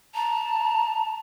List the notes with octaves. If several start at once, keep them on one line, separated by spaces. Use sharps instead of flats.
A5 A#5